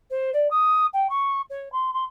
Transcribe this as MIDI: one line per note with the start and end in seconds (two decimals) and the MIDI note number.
0.10 0.30 72
0.33 0.47 74
0.50 0.86 87
0.93 1.07 79
1.09 1.41 85
1.50 1.71 73
1.72 1.90 84
1.93 2.04 84